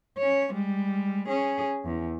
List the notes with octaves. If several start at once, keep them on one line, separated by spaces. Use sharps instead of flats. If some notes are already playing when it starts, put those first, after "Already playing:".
C#4 C#5
G3 G#3
C#4 G#4
E2